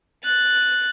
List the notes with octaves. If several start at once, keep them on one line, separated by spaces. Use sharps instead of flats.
F#6 A6